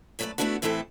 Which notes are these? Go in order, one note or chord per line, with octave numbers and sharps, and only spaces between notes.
F#2 A3 D4 F4 B4 D5
A3 B3 C4 D4 E4 F#4
A2 E3 C4 E4 A4 B4